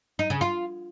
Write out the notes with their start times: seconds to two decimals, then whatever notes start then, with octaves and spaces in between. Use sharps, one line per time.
0.19 D#4
0.30 C#3
0.41 F4